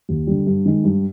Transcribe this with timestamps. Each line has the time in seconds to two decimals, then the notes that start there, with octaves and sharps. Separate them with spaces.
0.09 D#2
0.27 D3 G3
0.47 G2
0.65 D#3 G#3
0.84 G2